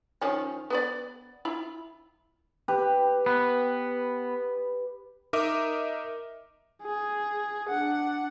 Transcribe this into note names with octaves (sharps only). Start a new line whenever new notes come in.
D#3 F3 C#4
B3 B4 D5
E4 F4 B5
G4 B4
B3
D#4 A#4 D#5 E5 D6
G#4
D4 F#5